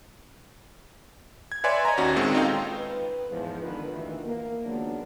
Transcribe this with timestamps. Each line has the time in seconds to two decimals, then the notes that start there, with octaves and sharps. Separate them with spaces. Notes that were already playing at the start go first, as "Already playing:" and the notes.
1.52 G#6
1.64 B4 C#5 D5 E5 G#5 C6
1.85 D#5 A#5
1.97 D#2 C#4 F#4
2.16 A#2 D#3 G#3 C4
2.35 D#4 F4 A4 D#5 F5 G5
2.73 B4
3.30 E2 G#2 F3
3.61 D3 D#3 F4 B4
3.93 D2 A#2 D#3 E3
4.26 A#3
4.65 D#3 F3 F#3 G#3 B3 D4